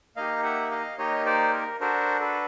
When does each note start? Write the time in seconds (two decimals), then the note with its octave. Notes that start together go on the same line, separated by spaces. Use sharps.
0.16 A#3 D#4 G4 D#5 F5
0.43 E5 F#5
0.71 D#5 F5
0.98 A#3 D#4 G4 C#5 D#5
1.26 C5 D5
1.53 A#4
1.80 D4 F#4 A4 A#4 C5
2.21 A4 B4